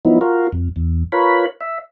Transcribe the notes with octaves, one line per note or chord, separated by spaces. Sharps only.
F3 F#3 B3 D#4 E4
F4 F#4 A#4
F2
E2
F4 A#4 B4 C#5 B5
E5